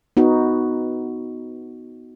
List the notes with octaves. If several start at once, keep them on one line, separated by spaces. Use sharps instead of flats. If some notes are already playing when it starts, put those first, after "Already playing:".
B3 D#4 F#4